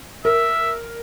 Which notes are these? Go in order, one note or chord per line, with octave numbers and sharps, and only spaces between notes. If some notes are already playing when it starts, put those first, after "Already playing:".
A#4 E5